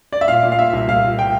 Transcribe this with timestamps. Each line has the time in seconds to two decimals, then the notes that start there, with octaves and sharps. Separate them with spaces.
0.12 D5
0.21 E5
0.28 A#2 F5
0.43 A#2
0.52 F5
0.58 A#2 E5
0.73 C2
0.88 A#2 F5
1.04 A#2
1.19 G5